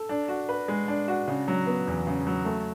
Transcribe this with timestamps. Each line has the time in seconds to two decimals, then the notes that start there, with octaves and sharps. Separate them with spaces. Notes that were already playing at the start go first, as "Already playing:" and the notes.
Already playing: A4
0.09 D4
0.28 F#4
0.49 B4
0.68 G#3
0.88 D4
1.08 F#4
1.28 C#3
1.48 F#3
1.67 B3
1.87 E2
2.07 C#3
2.27 F#3
2.45 A3